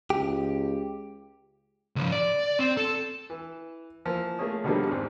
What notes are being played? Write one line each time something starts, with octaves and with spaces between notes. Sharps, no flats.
C#2 G4
C#2 F3
D5
C4
A4
E3
E3 F3 A#3
A3 A#3 G#4 C#5 D#6
B2 D3 D#3 F3 G3 A#3
E2 G#2 C4